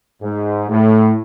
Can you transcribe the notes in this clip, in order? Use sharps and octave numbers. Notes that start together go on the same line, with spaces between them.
G#2
A2